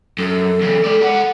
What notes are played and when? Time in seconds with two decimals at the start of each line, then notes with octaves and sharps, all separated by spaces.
0.19 F#2 A4
0.62 E2 C#3
0.84 G#3 D5
1.02 A#4 F#5